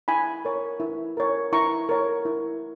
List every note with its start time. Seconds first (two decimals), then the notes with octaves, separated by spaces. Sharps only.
0.08 E4 G#5 B5
0.45 A#4 C#5
0.80 E4
1.17 A#4 C#5
1.53 E4 A#5 C#6
1.89 A#4 C#5
2.25 E4